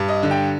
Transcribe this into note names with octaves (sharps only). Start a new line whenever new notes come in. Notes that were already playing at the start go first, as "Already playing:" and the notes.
Already playing: G2
D#5
D3
G5